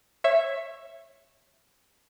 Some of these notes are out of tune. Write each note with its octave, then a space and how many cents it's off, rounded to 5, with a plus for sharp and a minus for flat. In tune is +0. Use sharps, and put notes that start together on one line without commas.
C#5 -15 E5 +10